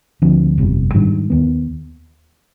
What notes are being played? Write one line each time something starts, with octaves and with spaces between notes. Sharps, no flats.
D2 D3 F3 C4
G1 F2 C3 G3
G#2 D#3 G3 D4
D#2 D#3 B3